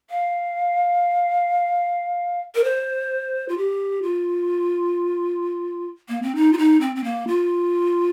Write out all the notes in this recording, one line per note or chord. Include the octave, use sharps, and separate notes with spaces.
F5
A#4
C5
F4
G4
F4
A#3
C4
D#4
F4
D#4
C4
C4
A#3
F4